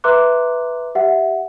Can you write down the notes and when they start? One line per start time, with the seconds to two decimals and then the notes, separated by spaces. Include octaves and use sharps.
0.04 B4 E5 A#5 C6 D6 F#6
0.95 G4 E5 F#5